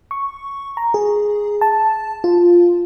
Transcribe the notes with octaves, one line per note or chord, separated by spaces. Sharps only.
C#6
A#5
G#4
A5
F4